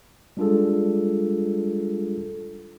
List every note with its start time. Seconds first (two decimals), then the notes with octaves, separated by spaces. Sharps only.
0.37 G3 G#3 D4 F4 G#4 A4